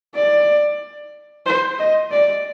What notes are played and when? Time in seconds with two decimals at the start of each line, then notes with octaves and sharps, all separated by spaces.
0.15 D5
1.46 C5
1.79 D#5
2.11 D5